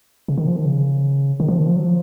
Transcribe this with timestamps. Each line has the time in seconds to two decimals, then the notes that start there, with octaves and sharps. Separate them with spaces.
0.28 C#3
0.38 D#3
0.47 F3
0.56 D#3
0.65 C#3
1.40 D#3
1.48 F3
1.58 D#3
1.67 F3
1.76 F#3
1.86 F3